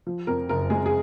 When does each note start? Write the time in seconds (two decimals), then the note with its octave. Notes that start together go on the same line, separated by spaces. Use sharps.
0.07 F3
0.27 F2 A#4
0.49 F#1 A#4
0.70 G#3 G#4
0.86 G#4